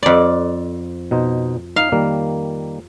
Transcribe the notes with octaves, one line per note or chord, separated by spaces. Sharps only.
F2 D5
B2 D#4 C5
D#4 F5
D#3 G3 A#3